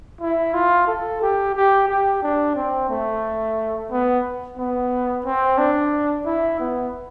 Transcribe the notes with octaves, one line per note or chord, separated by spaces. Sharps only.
E4
F4
A4
G4
G4
G4
D4
C4
A3
B3
B3
C4
D4
E4
B3